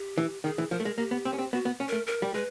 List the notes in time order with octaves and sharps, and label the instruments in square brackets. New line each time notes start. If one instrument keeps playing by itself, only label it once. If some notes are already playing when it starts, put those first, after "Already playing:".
Already playing: [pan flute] G4
[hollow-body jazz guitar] E3
[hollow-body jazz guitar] D#3 [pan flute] G#4
[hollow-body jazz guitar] E3
[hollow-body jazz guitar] F3 [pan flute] A#4
[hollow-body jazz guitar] A3
G#3
[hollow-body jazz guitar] A#3 [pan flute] G4
[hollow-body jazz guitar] B3
C4
C#4
C4
[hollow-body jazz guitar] B3 [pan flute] F#4
[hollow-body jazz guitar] B3
C#4
[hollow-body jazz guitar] A3 [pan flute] A#4
[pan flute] A#4
[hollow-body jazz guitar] G3
[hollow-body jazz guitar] G#3 [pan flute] B4